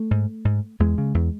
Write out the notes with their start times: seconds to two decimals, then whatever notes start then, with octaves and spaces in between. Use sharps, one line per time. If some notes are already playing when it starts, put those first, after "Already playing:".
Already playing: A3
0.11 G#2
0.45 G#2
0.80 E2 G#3
0.98 C#3
1.14 E2